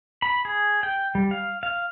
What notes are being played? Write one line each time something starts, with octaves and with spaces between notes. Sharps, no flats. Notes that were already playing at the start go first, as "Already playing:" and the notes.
B5
G#4
G5
G3
F5
F5